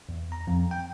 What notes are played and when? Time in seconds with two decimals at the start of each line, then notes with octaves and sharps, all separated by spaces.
0.09 E2
0.32 A#5
0.47 F2
0.71 G5